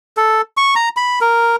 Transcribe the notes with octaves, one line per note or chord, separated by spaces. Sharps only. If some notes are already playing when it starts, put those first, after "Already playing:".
A4
C#6
A#5
B5
A#4